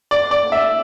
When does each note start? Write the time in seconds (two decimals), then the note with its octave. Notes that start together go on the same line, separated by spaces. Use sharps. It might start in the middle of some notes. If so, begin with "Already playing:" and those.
0.11 D5
0.31 D5
0.52 E5